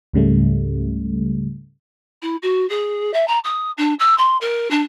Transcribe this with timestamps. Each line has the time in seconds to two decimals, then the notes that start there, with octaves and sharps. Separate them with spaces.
0.13 C#2 G#2 C#3 G3 A3
2.22 E4
2.42 F#4
2.69 G#4
3.13 E5
3.27 A#5
3.44 D#6
3.77 D4
3.99 E6
4.18 C6
4.41 A#4
4.70 D4